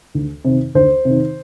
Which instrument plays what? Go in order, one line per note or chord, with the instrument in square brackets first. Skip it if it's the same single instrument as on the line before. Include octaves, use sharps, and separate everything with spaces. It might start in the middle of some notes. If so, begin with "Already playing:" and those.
[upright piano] D2
C3 D#3
D2 C5
C3 D#3